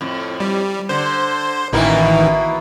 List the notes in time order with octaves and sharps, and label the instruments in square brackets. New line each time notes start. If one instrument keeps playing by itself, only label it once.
[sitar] F2 A2
[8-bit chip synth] G3
[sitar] D3 [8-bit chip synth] C5
[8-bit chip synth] A1 D#3 E3 [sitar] B2 A#3 E4